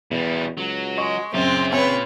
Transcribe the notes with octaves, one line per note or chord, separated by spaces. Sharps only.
E2 B2 G3
C#2 F#3
G#3 D#5 C#6
F#2 A#2 C#3 C4 F4
C4 B4 C#5